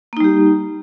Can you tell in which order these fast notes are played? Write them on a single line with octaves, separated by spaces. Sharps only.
A#3 D#4 G3 G4